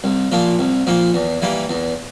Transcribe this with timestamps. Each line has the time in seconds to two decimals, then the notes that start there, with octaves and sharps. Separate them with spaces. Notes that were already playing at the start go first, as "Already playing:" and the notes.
0.04 C2
0.32 A#2 F3 A#3
0.59 C2
0.87 A#2 F3 A#3
1.14 E2
1.42 E3 G3 A#3
1.69 E2